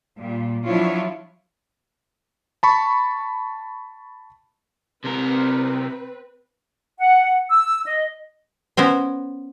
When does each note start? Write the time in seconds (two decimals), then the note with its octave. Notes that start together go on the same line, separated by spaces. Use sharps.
0.19 A#2 G3
0.66 F3 F#3 D4 E4 F4 C#5
2.63 A5 B5 C#6
5.04 C3 C4 A#4 B4
6.98 F#5
7.49 E6
7.87 D#5
8.77 B3 C#4 A#4 C5